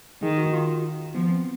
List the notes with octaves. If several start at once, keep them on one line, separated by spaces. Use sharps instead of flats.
D#3 G#4
F#4
F4
F3 B3
C4